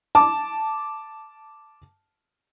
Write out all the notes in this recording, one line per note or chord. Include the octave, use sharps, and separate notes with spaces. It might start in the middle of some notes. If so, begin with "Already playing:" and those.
A5 D6